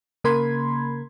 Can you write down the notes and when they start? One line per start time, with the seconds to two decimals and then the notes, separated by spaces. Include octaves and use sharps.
0.24 C#3 A#3 A#4 B5 C6 G#6